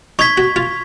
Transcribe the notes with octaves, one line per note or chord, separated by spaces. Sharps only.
D#4 C#6 G#6 B6
F#4
F4